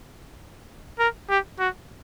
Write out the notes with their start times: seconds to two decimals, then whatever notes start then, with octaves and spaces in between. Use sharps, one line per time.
0.99 A#4
1.30 G4
1.60 F#4